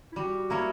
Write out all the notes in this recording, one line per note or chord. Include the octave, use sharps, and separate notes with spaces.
E4
G3 F#4
A#3 E4 A#4 C#5